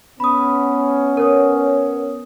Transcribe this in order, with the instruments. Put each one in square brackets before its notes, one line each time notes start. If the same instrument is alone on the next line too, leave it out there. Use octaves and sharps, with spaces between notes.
[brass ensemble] B3 C#4 [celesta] B5 D#6
[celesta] A#4 C#5 D#6